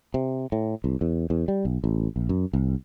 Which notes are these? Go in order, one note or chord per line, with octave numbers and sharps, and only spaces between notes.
C3
A2
C2
E2
E2
G3
B1
A1
A#1
F#2
C2